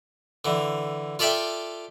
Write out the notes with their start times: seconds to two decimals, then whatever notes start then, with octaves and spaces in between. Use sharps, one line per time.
0.45 D3 E3
1.19 F4 A4 D5 E5 G5